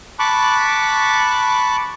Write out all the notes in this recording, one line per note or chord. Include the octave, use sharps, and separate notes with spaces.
A5 B5 C#6 D6 F#6